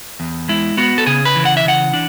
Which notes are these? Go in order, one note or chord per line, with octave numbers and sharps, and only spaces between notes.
E2
G#3 E4
B3 F#4
A4
C#3 G#4
B4
E3
F#5
E5
C#3 F#5
D4